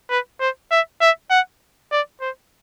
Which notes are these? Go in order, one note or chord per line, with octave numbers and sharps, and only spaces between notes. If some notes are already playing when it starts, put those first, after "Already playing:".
B4
C5
E5
E5
F#5
D5
C5